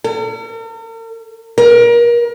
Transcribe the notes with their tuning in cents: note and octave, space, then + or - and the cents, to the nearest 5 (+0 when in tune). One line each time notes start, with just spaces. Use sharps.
A#4 -45
A#4 +30